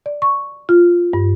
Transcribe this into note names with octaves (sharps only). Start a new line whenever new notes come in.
D5
C#6
F4
G2